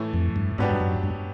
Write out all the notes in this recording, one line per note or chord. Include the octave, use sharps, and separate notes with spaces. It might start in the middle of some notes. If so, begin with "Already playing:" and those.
Already playing: A2 E3 A3
F2
G2
G#2 B2 F#3 B3 D4 G4
G2
F#2
G2